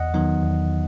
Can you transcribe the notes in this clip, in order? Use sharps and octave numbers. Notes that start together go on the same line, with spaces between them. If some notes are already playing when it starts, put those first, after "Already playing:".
Already playing: E2 D#5 F#5
D#3 F#3 B3 D#4
E2